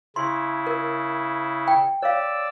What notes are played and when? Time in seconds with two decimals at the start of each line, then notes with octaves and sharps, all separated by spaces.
0.16 C#3 E4 C6
0.67 A#4
1.68 G5
2.03 C#5 D5 F5 E6